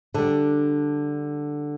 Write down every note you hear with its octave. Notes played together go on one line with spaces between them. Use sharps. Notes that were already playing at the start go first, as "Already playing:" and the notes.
D3 G3 D4